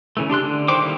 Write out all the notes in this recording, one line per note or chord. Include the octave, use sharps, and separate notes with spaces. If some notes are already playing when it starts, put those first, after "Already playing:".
C#3 E3 A3
D4 G4 C6 F#6
D3
D#3 E4 C5 G5 D6
D#3 G3 A#3 E4